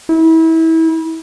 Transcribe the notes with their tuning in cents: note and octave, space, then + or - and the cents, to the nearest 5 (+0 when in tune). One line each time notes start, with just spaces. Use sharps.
E4 -30